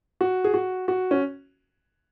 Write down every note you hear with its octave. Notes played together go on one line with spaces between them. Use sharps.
F#4
G#4
F#4
F#4
C#4